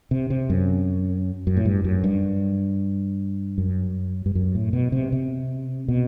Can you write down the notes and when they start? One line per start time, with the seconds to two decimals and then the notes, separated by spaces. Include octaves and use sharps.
0.11 C3
0.30 C3
0.50 F#2
1.47 F#2
1.57 A2
1.65 G2
1.84 F#2
2.04 G2
3.58 F#2
4.26 G2
4.35 F#2
4.55 A2
4.73 B2
4.92 C3
5.12 C3
5.88 B2